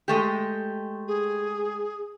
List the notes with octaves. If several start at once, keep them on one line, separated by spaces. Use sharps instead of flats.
G#3 A3 G4
G#4